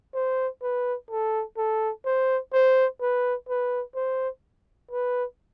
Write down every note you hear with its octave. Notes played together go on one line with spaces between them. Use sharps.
C5
B4
A4
A4
C5
C5
B4
B4
C5
B4